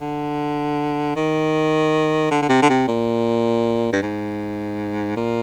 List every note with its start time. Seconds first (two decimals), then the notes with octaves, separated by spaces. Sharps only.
0.01 D3
1.16 D#3
2.31 D3
2.42 D3
2.49 C3
2.62 D3
2.69 C3
2.88 A#2
3.92 G2
4.02 G#2
5.16 A#2